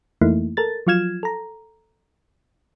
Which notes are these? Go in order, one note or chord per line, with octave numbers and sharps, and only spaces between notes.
F2 E3 A3 A#3 D#4 E4
A4 A#4 A6
F3 F#3 F4 F6 G#6 E7
A4 A#5